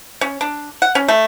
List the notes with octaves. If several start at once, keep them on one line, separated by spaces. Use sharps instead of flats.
C#4
D4
F#5
C#4
A3